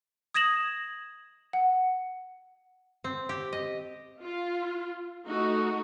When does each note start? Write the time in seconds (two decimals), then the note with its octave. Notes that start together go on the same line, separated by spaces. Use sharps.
0.34 D#6 G#6 A#6 E7 F#7
1.53 F#5
3.04 C4
3.29 G4
3.53 D#5
4.21 F4
5.26 A3 D#4 F#4